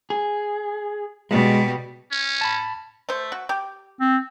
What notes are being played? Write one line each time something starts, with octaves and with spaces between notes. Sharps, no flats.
G#4
B2 G3 G#3
C#4
A5 B5
A3 C5
F#4
G4
C4